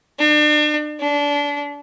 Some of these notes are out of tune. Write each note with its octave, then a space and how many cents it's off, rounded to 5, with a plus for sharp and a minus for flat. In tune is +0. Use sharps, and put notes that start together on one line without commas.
D4 +35
D4 -25